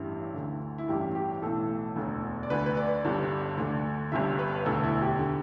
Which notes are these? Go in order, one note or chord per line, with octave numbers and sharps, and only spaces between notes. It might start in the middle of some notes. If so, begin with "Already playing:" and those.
Already playing: A1 G2 E3 E4
D2 D3
E4
A1 G2 E3 G4
G4
B1 A2 E3 A4
E1 D2 D3
D5
D2 D3 B4
B4
D5
G1 G2 D3
D2 D3
G1 G2 D3 E5
B4
E1 D2 D3 A4
E4
G4
D3